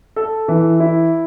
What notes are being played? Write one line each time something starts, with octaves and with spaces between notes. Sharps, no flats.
A4
E3
E4